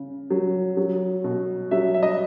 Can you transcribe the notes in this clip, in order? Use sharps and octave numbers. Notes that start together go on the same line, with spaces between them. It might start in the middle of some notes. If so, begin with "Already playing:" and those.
Already playing: C#3
F#3
F#3
B2
F#3 E5
E5
D#5